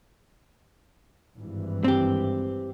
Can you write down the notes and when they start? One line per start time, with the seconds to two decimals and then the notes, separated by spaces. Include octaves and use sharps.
1.36 G#1 G2 E3
1.84 C4 G4